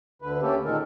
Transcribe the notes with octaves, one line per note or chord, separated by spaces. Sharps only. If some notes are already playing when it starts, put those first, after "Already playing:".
D2 D3 B4
A3 A#3 C#4 G4 A4
A#2 D#3 G#3 A4 A#4